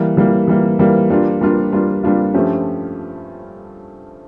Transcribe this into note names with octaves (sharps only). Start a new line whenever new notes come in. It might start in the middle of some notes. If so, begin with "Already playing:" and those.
Already playing: E3 G3 A#3
E3 G3 A#3
E3 G3 A#3
E3 G3 A#3
G3 A#3 D4 F4
G3 A#3 D4 F4
G3 A#3 D4 F4
G3 A#3 D4 F4
G2 F3 A3 C#4 G4